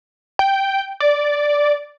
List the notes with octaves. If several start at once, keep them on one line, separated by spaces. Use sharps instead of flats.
G5
D5